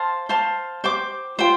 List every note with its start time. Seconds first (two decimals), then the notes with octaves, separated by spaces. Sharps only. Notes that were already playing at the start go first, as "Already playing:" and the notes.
Already playing: C5 F5 A5 C6
0.29 C5 F5 A5 C6
0.84 C5 G5 D6
1.39 F4 C5 G5